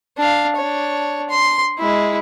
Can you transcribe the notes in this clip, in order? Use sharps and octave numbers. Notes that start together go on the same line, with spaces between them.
D4 F5
D4 C#5
C6
G#3 E4